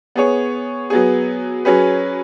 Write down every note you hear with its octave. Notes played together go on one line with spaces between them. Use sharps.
B3 G#4 C#5
F#3 B3 G#4
F#3 C#4 G#4 B4